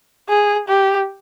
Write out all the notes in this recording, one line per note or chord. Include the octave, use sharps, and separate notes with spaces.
G#4
G4